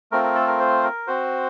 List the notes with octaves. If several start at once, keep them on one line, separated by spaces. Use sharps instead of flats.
A3 C4 F4 A#4
A#4
A4
A#4
C5
A#4
C4 F#4 C5